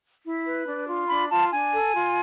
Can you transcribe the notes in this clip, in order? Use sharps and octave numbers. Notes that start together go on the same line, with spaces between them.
E4
B4
D4
F4
D4 B5
F4 A5
D4 G#5
A4
F4